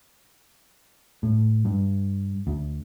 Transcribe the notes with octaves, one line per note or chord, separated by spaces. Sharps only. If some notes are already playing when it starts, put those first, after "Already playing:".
A2
G2
D2